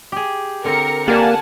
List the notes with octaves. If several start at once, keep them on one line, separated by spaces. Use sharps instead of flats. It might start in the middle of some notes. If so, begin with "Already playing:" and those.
G4 G#4
D3 C4 A#4 C#7
A#3 F4 G4 A#4 D5 F#5 G#5 A5